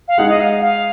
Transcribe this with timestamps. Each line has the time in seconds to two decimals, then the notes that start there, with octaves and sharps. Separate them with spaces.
0.08 F5
0.18 G#3 D#4 G#4 F#5
0.29 D#5
0.40 F5
0.62 F5